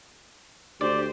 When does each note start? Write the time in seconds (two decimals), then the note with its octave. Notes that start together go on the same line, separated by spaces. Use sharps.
0.81 D2 G4 C5 D5